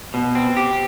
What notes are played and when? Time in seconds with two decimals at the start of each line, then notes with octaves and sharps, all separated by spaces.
0.14 B2
0.35 C4
0.57 G4